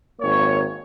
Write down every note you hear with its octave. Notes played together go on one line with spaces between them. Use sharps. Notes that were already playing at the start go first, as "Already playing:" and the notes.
G#1 A#3 C#5